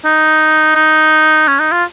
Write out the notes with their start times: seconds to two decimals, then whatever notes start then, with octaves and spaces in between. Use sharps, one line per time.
0.05 D#4
0.76 D#4
1.48 C#4
1.60 D#4
1.72 F4